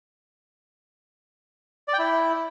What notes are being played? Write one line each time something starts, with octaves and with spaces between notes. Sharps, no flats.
D5
G5
E4